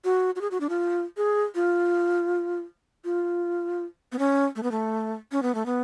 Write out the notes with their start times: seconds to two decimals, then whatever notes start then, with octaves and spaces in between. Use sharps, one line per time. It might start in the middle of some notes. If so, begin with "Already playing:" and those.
0.04 F#4
0.36 F#4
0.41 G#4
0.51 F#4
0.61 D4
0.69 F4
1.17 G#4
1.55 F4
3.05 F4
4.12 B3
4.19 C#4
4.56 A3
4.63 B3
4.72 A3
5.32 C#4
5.43 B3
5.55 A3
5.66 B3